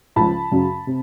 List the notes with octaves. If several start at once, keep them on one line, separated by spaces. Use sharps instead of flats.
C#2 C#3 F3 A5 B5
F#2 C#3 F#3
C3